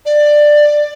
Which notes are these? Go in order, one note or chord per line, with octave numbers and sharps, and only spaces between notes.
D5